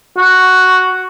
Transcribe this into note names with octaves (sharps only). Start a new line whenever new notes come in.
F#4